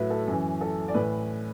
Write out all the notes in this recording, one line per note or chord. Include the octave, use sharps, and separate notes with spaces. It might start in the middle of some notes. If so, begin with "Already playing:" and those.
Already playing: A2 F#3 B4 E5
A4
F#2 E3
A4
D5
A2 E3 B4